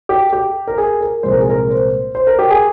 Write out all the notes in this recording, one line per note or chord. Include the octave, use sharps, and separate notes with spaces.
G4
G4
A#4
G#4
A#4
C2 A#2 F3 G#3 C5
A#4
G#4
A#4
C5
C5
A#4
G4
G#4